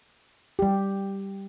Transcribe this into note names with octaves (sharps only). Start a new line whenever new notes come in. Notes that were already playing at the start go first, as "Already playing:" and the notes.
G3 G4